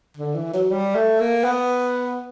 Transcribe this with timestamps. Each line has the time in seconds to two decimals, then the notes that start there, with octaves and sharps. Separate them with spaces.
0.17 D3
0.35 E3
0.53 F#3
0.71 G3
0.95 A3
1.20 A#3
1.44 B3